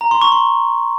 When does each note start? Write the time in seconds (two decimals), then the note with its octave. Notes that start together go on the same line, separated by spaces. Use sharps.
0.01 A#5
0.11 C6
0.22 C#6
0.32 C6